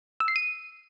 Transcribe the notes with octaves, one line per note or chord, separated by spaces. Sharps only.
E6
C7
D#7